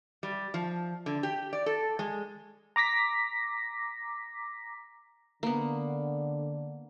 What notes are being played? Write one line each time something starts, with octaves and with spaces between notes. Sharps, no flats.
G3
F3
D3
G4
D5
A4
G#3
A#5 D6 A#6 B6
D3 A#3 B3